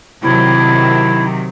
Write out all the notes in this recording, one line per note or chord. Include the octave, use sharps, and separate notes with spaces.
C3 D#3 F#3 E4